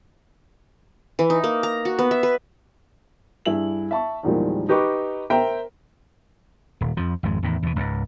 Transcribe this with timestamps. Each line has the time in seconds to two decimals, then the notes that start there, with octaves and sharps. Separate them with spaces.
1.19 E3
1.30 D#4
1.44 A#3
1.63 A#5
1.85 F#4
1.99 B3
2.11 E5
2.23 B4
3.46 G2 E4 G#4 F#7
3.91 E5 A5 C#6
4.23 E2 A#2 D#3 F3 G3 G#3
4.69 D#4 G4 B4 C#6 D6
5.30 A#4 C5 E5 G5 A#5
6.81 D#1
6.97 F2 F3
7.23 G#1 F2 G#3
7.43 E2 A2 D#3
7.63 E2 B2
7.76 C#2 G#2